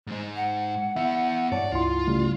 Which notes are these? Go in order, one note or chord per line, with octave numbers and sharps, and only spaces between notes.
G#2 G#3
F#5
B3 E4 E5
G2 C#5 D5 A5
C#2 E4 F4 C6
C#3 G3 A3